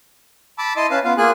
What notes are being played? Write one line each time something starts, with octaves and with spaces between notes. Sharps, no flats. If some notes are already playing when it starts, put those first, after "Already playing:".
A5 B5 D6 E6
E4 D#5 A5 C6
C#4 B4 F5 A5
B3 F4 F5
A#3 F4 G#4 G#5 F#6